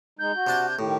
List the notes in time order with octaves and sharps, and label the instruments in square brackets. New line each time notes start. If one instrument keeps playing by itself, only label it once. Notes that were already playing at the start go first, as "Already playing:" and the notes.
[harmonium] G#3 D#4 [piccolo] G6
[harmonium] F#4
[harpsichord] C3 D4 A5
[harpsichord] A2 [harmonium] D#3 G4